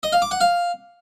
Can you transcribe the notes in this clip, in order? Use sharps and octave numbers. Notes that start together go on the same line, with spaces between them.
D#5
F5
D6
F#5
F5